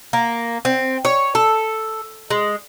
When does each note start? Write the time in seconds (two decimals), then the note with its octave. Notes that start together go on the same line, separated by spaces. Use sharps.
0.13 A#3
0.65 C4
1.05 C#5
1.35 A4
2.30 G#3